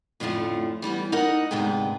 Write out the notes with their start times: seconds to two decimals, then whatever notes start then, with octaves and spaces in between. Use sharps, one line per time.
0.20 F2 A2 D3 F3 A3 C#4
0.82 E3 G3 B3 C#4
1.12 D#4 A#4 D#5 F#5
1.51 D2 G#2 C3 B3 G#4 G5